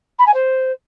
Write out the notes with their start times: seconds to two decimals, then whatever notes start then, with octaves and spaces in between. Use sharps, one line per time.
0.19 B5
0.26 G#5
0.34 C5